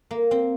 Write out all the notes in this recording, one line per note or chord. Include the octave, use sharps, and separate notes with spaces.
A#3
C4